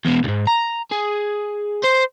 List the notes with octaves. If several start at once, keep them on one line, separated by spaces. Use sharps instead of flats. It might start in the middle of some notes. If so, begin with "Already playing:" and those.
E2 B2
C#2 G#2
A#5
G#4
C5